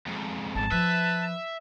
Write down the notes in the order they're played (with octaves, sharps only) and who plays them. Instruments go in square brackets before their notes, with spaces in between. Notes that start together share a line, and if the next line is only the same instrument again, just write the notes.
[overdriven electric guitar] F2 G#2
[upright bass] G#1 [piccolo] A5
[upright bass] F3 [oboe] B4 [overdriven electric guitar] E5